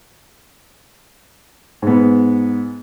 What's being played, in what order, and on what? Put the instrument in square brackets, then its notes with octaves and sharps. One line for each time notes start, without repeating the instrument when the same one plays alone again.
[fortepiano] G#2 B3